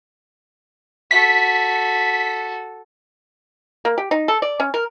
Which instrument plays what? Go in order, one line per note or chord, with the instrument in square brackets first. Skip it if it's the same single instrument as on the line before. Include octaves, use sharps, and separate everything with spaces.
[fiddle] F#4 A4 [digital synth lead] B6
[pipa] A#3
G4
D#4
A4
D5
C#4
A#4